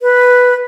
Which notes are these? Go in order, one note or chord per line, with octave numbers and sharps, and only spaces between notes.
B4